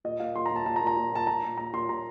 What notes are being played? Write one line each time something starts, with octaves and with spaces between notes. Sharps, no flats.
A#2 D#5
A#2 F5
A#2 C6
A#5
A#2
A5
A#2 A5
A#5
A#2
A#5
A#2
A#2 A5
A#2 A#5
A#2
A#2 A#5
A#2 C6
A#2 A#5